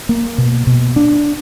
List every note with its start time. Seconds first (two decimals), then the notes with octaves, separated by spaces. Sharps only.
0.09 A#3
0.38 B2
0.67 B2
0.96 D4